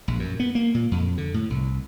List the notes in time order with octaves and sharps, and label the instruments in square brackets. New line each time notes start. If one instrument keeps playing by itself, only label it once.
[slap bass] A#1
F#2
B3
A#3
A#2
F2
D3
A2
C2